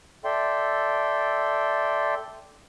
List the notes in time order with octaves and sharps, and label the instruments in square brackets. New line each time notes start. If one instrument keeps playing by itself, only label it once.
[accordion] A4 D5 E5 G5 C6